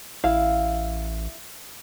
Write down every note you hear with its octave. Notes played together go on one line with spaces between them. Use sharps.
A1 E4 F5